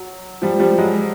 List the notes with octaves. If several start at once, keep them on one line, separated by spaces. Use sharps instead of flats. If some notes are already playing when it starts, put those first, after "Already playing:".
Already playing: F#3
F3 G3
F3 G3
F#3 G#3